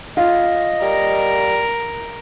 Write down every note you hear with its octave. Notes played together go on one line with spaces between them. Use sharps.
F4 D#5
G3 A#4